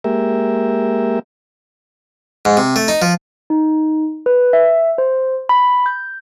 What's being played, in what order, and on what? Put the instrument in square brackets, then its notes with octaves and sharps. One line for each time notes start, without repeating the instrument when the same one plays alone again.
[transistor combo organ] G#3 A#3 G4 A#4 E5
[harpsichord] G#2
C3
A3
D#4
F3
[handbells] D#4
B4
E5
C5
B5
G6